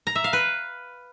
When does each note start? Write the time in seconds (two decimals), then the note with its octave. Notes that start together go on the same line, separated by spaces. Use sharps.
0.07 A#5
0.15 E5
0.24 F5
0.33 B4